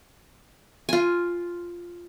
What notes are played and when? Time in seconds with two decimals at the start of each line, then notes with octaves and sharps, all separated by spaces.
0.89 F4 G#5